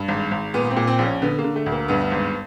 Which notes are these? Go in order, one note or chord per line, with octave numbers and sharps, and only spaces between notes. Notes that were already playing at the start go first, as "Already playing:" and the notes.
Already playing: G2
G#1
G#1
A#2 B3
C4
A#2
C4
A#1
C#4
D3 B3
A#3
D3
A3
D2
A#3
G2 B3
G#1